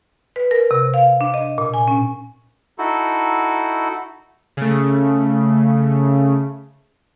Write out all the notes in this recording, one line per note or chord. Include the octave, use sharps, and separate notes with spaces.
B4
A#4
C3
F5
D4
D#5
A#2
G#5
C#4
D#4 E4 F#4 A4
C#3 A3